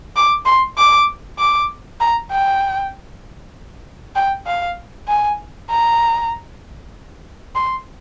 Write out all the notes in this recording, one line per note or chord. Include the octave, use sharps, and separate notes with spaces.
D6
C6
D6
D6
A#5
G5
G5
F5
G#5
A#5
C6